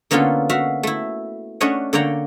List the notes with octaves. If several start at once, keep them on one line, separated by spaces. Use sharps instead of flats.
D3 A#3 B3 C#4 F4 A4
F#4 E5 F5
A3 E4
A3 C#4 D4 C#5 D#5 F#5
D3 A#3 C#5 D5 G5 A#5